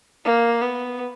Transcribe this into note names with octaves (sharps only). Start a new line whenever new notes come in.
A#3
B3